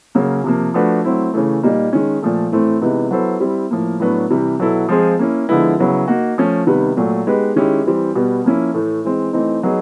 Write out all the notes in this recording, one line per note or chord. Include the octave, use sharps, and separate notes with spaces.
C#3 F#3 A#3 C#4
C3 F3 A#3
F3 A3 D4 F#4 B4
F#3 A3 C4 E4
C#3 E3 A3
A#2 G3 A#3 D#4
D#3 G#3 C#4
A#2 F3 A3
A2 E3 A3 C4
C3 E3 G#3 B3 D#4
F#3 B3 E4 A4 C5
G3 C4 E4
A2 F3 A#3
A2 F#3 B3 D4
C3 E3 G3
B2 F#3 B3 E4 A4
F3 G#3 C4 F4 G#4
A#3 C#4 E4
D3 F3 G#3 B3 E4
C#3 F#3 B3 E4
A#3 D#4 F#4
F3 A3 C#4
C3 D#3 G3 B3
A#2 F#3 A3
G#3 B3 D#4 G4 B4
D#3 G#3 C#4 E4 G4
E3 G3 C4
B2 G3 B3
F3 A#3 C#4 E4
A2 E3 A3
E3 G#3 C4
E3 A3 C4 D#4
F#3 B3 D#4 G#4